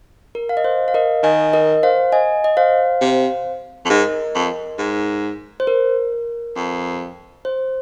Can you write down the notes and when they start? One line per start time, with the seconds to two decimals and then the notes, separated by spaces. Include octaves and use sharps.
0.35 A#4
0.49 F5
0.57 D#5
0.64 C5
0.88 F5
0.94 A#4 D#5
1.23 D#3 D#5 G#5
1.53 A#4 D#5
1.83 C5 F5
2.12 D#5 G#5
2.44 D#5
2.57 C5 F5
3.01 C3
3.86 F2
3.90 G#2 A#4 D#5
4.35 F2
4.79 G#2
5.60 C5
5.67 A#4
6.56 F2
7.45 C5